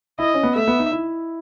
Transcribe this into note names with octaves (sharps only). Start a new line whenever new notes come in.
E4 D#5
C#4
B3
A3 E5
B3
D#4
E4